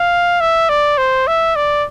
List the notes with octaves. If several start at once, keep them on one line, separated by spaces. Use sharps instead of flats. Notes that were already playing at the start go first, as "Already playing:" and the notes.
Already playing: F5
E5
D5
C5
E5
D5